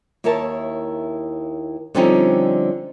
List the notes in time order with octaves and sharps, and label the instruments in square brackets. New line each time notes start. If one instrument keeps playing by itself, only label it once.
[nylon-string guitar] D#2 E4 A#4 C#5 A5
D3 F3 G3 C4 C#4 D#4